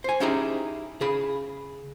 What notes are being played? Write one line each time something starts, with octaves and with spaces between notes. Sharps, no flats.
C5 G#5
C#4 D#4 E4 G4 G#4 A#5
C#3 G#4 B5